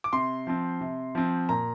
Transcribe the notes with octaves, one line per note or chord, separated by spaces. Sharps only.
D6
C3 C6
F3 C4
C3
F3 C4
A#2 A#5